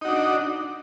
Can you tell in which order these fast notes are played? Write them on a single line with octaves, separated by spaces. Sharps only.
D#4 F#4 D4